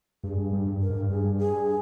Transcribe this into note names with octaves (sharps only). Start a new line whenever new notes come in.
G2 G#4
G2
G2
G2
A#4
G#2
G2
G2 G#4
G2
G#4